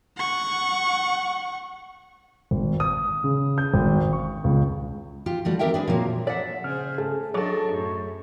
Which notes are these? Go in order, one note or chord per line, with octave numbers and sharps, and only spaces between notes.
F#5 C#6
G#1
D#6
C#3
G6
G#1
C#6
C#2
F4 G4
G3 A3 F#4
C4 G4 A#4 E5 G5
D4 G#4 B4
A#2 F3 F#3 A#3
D5 E5 F#5
C#3 G#4 C5 F6
G#2 A3 G#4
F#3 D4 A4 C#5 D#5
F#2 A2